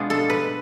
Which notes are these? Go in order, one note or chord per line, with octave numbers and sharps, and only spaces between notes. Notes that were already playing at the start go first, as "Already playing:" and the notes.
Already playing: B2 G#3 B3 D4 F4
A4
B4